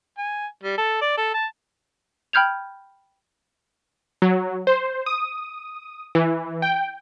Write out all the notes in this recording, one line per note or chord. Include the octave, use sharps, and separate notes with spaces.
G#5
G3
A4
D5
A4
A5
G5 B5 F6 G6 G#6 F7
F#3
C5
D#6
E3
G5